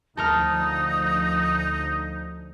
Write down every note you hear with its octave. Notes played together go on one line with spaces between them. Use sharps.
D2 F3 D#4 A4 A#4 D#6 F6